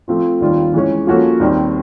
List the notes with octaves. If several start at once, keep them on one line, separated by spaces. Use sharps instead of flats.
F3 A3 C4 F4
D#2 D#3 G3 C4 F4
E3 G#3 C#4
F3 A#3 C#4 F#4 A4
D#2 D#3 G3 C4